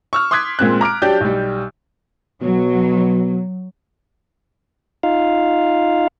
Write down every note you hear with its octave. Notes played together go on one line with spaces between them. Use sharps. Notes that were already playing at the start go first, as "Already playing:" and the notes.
C#6 E6 F6
C6 D6 D#6 F#6 G#6 B6
A#2 G#3 C4 F#6
A#5 D6 F6 D7
F#3 D4 G4 D5 G6
B1 G3
B2 F#3
D#4 F4 F5